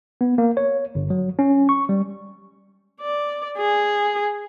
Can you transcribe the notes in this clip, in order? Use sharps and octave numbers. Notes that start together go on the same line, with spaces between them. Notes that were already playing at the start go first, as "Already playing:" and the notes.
B3
A#3
C#5
G1
F#3
C#4
C#6
G3
D5
G#4